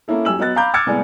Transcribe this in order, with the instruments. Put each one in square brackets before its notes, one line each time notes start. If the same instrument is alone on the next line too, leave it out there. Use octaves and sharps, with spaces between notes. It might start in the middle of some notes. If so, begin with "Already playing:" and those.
[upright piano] A#3 C#4 E4 A4
F#2 G4 G#5 E6 F#7
F#3 B3 D#5 F#6 A6
F5 A#5 B5 D6 G6
D6 E6 F6 G#6 A6 C#7
C2 A2 G#3 B3 D5 G#5